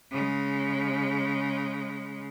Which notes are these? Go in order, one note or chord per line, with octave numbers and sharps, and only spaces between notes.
C#3 G#3